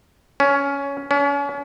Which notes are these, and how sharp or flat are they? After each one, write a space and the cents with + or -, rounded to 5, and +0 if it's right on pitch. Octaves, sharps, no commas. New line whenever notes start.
C#4 +15
C#4 +40